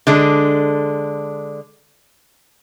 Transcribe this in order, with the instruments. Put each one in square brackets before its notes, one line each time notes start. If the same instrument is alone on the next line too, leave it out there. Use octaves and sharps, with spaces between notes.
[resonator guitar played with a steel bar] D3 G#3 D4